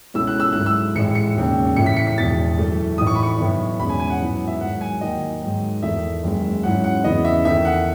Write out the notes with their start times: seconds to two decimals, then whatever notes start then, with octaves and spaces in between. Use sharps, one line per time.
0.14 C#2 B2 A3 C#4 E4 E6
0.27 F#6
0.40 E6
0.53 G#2 F#3 A3 E4 F#6
0.66 E6
0.95 A1 A2 G#3 C#7
1.15 C#7
1.36 E1 D#2 C#3
1.76 A1 A2 E3 C#7
1.86 B6
1.96 C#7
2.07 B6
2.18 E1 E2 B2 A6
2.58 F#2 E3 A3
2.98 A1 A2 E3 A3 D#4 D#6
3.07 C#6
3.15 B5
3.23 C#6
3.39 B1 A2 E3 B3 D#4
3.80 E2 B2 G#3 C#4 B5
3.89 G#5
4.00 G#5
4.10 F#5
4.21 G#2 F#3 B3 E4
4.47 E5
4.61 G#2 D#3 F#3 F#5
4.81 G#5
5.01 D#2 D#3 F#3 D#5
5.42 G#2 D#3 F#3
5.83 E2 D#3 A3 D#4 E5
6.23 F#1 F#2 D#3 G#3
6.63 G#2 F#3 C#4 E4 F#5
6.84 F#5
7.04 E2 C#3 E3 B3 E4 D#5
7.25 E5
7.45 E2 D#3 A3 E5
7.65 F#5